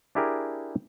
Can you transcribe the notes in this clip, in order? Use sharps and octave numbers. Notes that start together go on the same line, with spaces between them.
D4 E4 G4 G#4 A#4